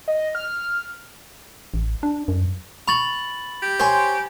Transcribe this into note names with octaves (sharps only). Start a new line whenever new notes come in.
D#5
F6
A1
D4
F#2
B5 C#6 A6 F#7
G4
C5 C#5 G#5 C6